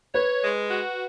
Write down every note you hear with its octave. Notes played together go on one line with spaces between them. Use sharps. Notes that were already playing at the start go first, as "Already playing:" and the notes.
B4 C#5
G#3
F#4